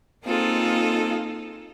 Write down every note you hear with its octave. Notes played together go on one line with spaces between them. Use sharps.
A#3 C4 D#4 F4 G#4 A4